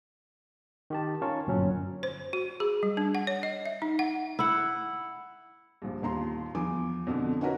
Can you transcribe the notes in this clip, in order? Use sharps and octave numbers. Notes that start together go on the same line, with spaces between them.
D#3 G4 A5
C#4 D#4 F4 A#4 A5 C#6
G1 F#2 A#2 F#3 C#4
C5
F#4
G#4
G3
D4
F#5
C#5
D#5
E5
D#4
F#5
E4 F#5
A#1 G2
D#1 D#2 A#5 C6
E2 F3 G#5 D6
F2 B2 D3
C#4 D#4 F#4 A#4 B4